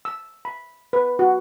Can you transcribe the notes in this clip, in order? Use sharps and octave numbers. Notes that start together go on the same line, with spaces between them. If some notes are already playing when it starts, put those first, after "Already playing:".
E6
B5
B4
F#4